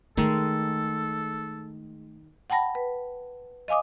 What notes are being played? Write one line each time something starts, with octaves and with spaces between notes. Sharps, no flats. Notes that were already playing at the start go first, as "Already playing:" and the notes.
D#3 G#3 A3 A4
F#5 G5 A5 B5 A#6
B4
D#5 F5 G#5 D6 D#6